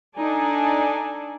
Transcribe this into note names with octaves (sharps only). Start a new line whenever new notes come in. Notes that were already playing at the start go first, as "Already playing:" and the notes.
D4 D#4 A4 D5 G#5